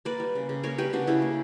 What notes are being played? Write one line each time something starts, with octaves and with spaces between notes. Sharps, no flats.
A#3 B4 D5
G3
C#3
C#3
A#3 A#4 C#5
G3 G4 B4
C#3 D4 F#4
C#3 E4 G4
A#3